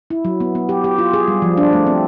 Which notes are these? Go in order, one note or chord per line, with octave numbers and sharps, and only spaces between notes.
E4
F#3
B3
B3
G4
G4
F4
G#4
G3
F3
D4
A3
C4